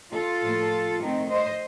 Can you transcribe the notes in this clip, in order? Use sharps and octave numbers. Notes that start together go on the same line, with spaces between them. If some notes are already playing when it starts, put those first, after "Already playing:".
F4 A4
A2 F3 A#3
D#3 A3 C4 D#4
C5 D#5